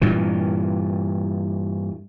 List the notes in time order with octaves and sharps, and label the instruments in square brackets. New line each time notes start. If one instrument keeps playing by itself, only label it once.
[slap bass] G2 A#2 E3